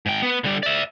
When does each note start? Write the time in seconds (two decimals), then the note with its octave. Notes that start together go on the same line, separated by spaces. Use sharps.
0.06 G#2 G5
0.22 B3
0.44 D3 G3
0.63 D5 E5